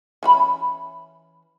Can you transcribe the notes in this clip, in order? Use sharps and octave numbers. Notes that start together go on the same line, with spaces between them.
E3 C#4 B5